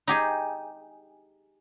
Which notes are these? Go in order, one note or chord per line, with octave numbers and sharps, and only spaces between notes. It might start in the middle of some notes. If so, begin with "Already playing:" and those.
D#4 G4 G#4